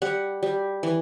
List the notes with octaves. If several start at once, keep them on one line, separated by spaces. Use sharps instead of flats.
G3 F#5
G3
E3